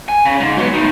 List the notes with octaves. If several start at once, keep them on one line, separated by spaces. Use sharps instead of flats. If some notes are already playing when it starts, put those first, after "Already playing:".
G#5
C#3
G#2
F#3 B3
A2 D#3